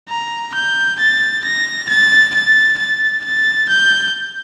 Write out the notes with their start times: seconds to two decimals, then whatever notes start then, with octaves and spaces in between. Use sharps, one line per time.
0.09 A#5
0.55 G6
1.00 A6
1.45 A#6
1.89 A6
2.34 A6
2.79 A6
3.24 A6
3.69 G6